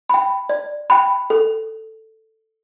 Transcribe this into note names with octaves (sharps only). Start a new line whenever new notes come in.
G5 B5
D5
G5 B5
A4